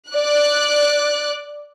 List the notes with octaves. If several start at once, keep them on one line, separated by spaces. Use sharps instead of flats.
D5 F#6